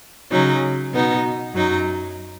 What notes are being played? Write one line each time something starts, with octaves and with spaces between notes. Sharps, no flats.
C#3 F#3 D#4
B2 B3 D#4
F#2 F#3 D#4